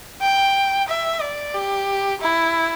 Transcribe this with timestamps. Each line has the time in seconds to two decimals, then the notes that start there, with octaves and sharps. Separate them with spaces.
0.22 G5
0.88 E5
1.21 D5
1.55 G4
2.21 E4